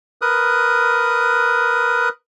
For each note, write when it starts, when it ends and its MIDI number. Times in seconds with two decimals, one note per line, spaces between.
0.22 2.09 70
0.22 2.09 71
0.22 2.09 87
0.22 2.09 90